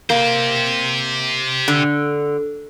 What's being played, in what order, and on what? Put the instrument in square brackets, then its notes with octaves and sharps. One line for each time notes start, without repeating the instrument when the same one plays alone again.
[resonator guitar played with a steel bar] A#3 [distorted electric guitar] G4 C5
[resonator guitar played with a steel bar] D3